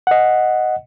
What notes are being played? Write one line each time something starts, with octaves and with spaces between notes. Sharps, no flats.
D#5 F#5